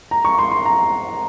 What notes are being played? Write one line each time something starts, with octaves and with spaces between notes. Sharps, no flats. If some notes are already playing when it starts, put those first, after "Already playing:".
A#5
C#6
C6
C6
A#5